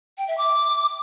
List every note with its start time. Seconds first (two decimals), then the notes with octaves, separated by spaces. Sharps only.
0.18 G5
0.28 E5
0.38 D6